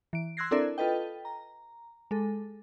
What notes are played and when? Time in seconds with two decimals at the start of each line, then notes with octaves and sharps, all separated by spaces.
0.13 E3 D7
0.37 C6 E6 F#6 G#6 A#6 C7
0.51 C4 D4 E4 A4 A#4 D5
0.78 F4 A4 B4 D#5 G5
1.25 A#5
2.11 G#3 A4